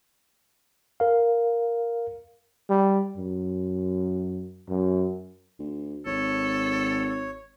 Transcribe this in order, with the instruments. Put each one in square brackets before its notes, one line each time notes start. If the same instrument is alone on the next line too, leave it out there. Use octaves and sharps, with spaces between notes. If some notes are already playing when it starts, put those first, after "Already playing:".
[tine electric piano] A#4 F5
[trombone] G3
F#2
F#2
[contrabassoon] D2
[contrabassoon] G#1 [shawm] A4 [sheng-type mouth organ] C#5